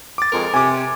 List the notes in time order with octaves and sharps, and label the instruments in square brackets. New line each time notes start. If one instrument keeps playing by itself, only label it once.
[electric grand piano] D6 A6
[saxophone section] F2 G#3 A#4
[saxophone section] C3 [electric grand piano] G#5 D6